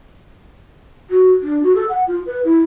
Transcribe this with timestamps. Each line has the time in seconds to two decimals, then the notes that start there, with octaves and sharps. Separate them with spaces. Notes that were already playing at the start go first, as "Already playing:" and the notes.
1.11 F#4
1.43 D4
1.63 F#4
1.76 A4
1.89 F#5
2.07 F4
2.26 B4
2.45 E4